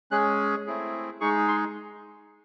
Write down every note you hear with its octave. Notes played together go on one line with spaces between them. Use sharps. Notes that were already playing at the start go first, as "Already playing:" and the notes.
G#3 C#4 G#4 F#6
A3 C4 E4 G#4
G#3 D#4 G#4 C#6
C6